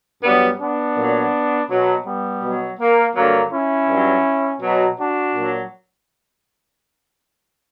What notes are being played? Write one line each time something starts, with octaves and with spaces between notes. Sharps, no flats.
G2 F#3 G3 B3
B3 D4
A#2 F#3
B2 F#3
G3 B3
B2 F#3
A#3
G2 D3 F#3 A#3
C#4 E4
G2 F#3
B2 F#3
D4 F#4
A#2 F#3